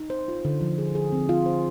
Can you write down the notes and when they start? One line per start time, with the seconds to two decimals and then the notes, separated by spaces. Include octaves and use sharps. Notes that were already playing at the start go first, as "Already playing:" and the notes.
Already playing: D#4
0.10 C5
0.28 F4
0.45 D3
0.61 F3
0.78 G#4
0.95 G#4
1.12 C4
1.29 F4
1.46 C5